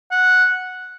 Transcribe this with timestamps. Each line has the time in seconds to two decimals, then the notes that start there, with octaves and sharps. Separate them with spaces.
0.11 F#5